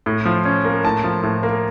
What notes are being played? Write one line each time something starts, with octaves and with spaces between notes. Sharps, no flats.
A2
F3
C#4
A#3
A2 A5
F3
A2
A#3